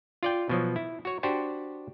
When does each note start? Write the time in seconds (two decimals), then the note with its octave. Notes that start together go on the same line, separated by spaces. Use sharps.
0.23 F4 D5 G5
0.49 B2 F3 F#3
0.76 E4
1.05 F#4 C#5
1.23 D4 F#4 G4 C5